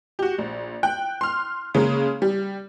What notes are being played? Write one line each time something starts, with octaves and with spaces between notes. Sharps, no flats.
F#4 G4
A#1
G5 F#6
C6 F6
C#3 G#3 A#3
G3